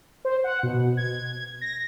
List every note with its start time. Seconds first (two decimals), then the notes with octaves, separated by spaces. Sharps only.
0.25 C5
0.44 F#5
0.63 B2
0.97 G#6
1.61 A#6